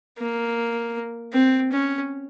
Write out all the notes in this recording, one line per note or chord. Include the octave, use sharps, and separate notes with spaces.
A#3
C4
C#4